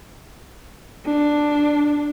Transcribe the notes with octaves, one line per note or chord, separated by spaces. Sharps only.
D4